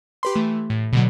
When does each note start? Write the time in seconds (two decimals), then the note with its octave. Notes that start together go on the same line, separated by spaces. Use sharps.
0.23 G4 B4 C6
0.35 E3 A3
0.70 A2
0.93 B2 D3 F#3